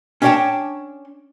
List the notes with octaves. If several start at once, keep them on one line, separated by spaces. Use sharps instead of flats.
C#4 D4 C#5 F5 G5 A5